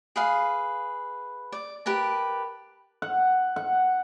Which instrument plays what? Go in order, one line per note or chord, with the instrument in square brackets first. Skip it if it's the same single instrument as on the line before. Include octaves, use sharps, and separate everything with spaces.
[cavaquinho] G#4 B4 F5
D5
G4 A#4 B4 A5
[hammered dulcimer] F#5
F#5